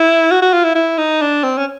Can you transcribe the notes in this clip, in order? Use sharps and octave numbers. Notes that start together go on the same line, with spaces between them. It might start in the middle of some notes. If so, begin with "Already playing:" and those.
Already playing: E4
F#4
F#4
F4
E4
E4
D#4
D4
C4
C#4